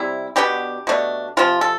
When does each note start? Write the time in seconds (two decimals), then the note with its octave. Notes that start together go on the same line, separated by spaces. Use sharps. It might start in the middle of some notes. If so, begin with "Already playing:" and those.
Already playing: C3 G3 C4 E4
0.36 B2 B3 D4 G4
0.87 B2 A3 D4
1.37 C3 F3 C4 F4
1.61 A4